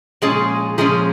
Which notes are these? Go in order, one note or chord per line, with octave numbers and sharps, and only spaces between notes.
A#2 F3 G#3 C#4 G#4
A#2 F3 G#3 C#4 G#4